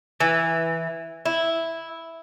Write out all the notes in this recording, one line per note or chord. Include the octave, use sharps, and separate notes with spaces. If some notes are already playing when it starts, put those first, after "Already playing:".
E3
E4